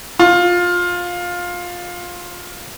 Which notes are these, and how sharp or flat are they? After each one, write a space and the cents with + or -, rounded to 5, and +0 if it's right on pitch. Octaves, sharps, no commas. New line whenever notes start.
F4 +15